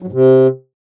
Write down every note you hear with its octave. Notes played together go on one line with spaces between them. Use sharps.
F#3
G#2
C3